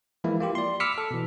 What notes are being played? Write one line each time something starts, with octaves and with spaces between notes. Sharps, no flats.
E3 F3 G#3 A#3 E4
A#3 F4 G4
D5 C6
B5 D6 E6 F6 B6 C#7
A4
B2 E3